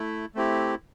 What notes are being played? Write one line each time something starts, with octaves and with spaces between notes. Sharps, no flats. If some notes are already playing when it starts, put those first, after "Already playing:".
Already playing: A3 E4
A3 C4 E4 G4